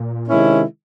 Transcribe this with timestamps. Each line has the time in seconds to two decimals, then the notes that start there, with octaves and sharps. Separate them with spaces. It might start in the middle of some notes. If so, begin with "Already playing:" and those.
Already playing: A#2
0.28 C3 D#3 G#3 C#4 E4